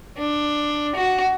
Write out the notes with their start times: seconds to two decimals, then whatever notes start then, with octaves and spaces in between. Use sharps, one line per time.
0.17 D4
0.95 F#4